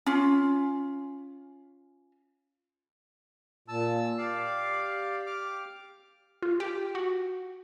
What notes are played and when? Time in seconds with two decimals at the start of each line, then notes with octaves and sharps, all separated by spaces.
0.06 C#4 F4
3.68 A#2 A5 E6
4.18 G4 D5 F5
5.26 D6 F6
6.42 F4
6.60 G4
6.95 F#4